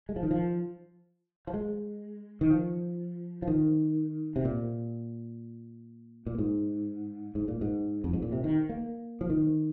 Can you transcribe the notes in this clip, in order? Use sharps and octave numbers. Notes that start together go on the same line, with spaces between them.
G#3
F3
D#3
F3
F3
G#3
D#3
F3
F3
D#3
C3
A#2
A#2
G#2
G#2
A#2
G#2
F2
G#2
A#2
C3
D#3
A#3
F3
D#3